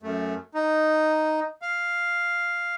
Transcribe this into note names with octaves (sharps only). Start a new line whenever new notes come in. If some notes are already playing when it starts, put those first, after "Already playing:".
F#2 A3
D#4
F5